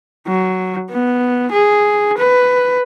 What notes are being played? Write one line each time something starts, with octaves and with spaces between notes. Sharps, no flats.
F#3
B3
G#4
B4